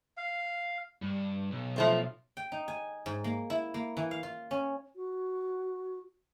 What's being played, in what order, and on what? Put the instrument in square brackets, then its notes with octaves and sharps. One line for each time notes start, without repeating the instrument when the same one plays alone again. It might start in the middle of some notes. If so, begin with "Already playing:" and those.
[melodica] F5
[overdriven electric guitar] G2
B1
[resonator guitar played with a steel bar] F3 A3 C4
[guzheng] G5
D#4
G#5
G#2
A#3
E4
A#3
E3
F5
F4
C#4
[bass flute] F#4